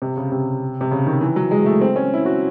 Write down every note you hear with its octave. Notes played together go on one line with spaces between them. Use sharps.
C3
C#3
C3
C3
C#3
D#3
E3
F#3
G#3
A3
C4
C#4
E4
F#4